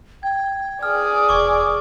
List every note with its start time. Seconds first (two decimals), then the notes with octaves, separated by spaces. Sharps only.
0.23 G5 G#6
0.83 G#4 D5 D#6 F6
1.29 E1 C#6 D6